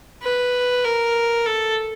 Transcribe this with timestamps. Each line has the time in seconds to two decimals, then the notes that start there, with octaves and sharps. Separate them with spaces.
0.23 B4
0.84 A#4
1.46 A4